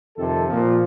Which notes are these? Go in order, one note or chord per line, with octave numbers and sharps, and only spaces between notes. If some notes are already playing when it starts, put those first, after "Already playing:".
F2 C3 D#3 A4
A#2 F3